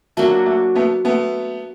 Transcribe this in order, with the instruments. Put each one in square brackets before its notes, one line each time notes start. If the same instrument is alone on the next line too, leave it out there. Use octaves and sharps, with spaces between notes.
[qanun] F#3 A#3 D4 F#4 [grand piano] A3
[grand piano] A3
A3 B3
A3 B3